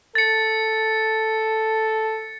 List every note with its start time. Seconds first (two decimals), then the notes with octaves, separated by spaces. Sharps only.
0.15 A4 A6 C#7